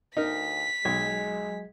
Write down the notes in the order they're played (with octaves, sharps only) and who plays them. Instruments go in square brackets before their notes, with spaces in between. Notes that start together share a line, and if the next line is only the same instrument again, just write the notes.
[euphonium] D2 [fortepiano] D#4 A#4 [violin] B6
[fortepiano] B1 [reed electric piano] F#3 G#6 [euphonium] G#3